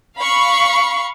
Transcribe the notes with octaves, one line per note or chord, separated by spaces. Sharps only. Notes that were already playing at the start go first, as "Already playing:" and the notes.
F5 B5 C#6